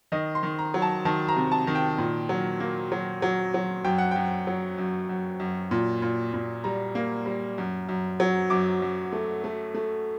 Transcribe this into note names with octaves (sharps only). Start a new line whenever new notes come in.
D#3 D#5
C6
D#3
A#5
F#3
A5
D#3 A5
A#5
C3
A5
D#3
G5
A#2
F#3
A#3
F#3
F#3
F#3
F#2 G5
F#5
F#2 G5
F#3
F#2
F#2
F#2
A#2
A#2
A#2
G3 A#5
A#3
G3
F#2
F#2
F#3
F#2 D6
F#2
A3
A3
A3